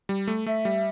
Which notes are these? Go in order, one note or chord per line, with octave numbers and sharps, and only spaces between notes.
G3
A3
A3 E5
G3